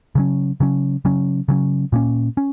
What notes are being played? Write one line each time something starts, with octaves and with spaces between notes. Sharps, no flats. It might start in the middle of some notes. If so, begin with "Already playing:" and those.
C#3 F#3 C#4
C#3 F#3 C#4
C#3 F#3 C#4
C#3 F#3 C#4
A#2 A#3 C#4
C#4